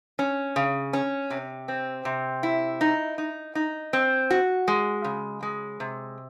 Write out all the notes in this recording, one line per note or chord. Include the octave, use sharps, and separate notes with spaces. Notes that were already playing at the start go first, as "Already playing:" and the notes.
C#4
C#3
C#4
C3
C4
C3
E4
D#4
D#4
D#4
C4
F#4
G#3
C#3
G#3
C3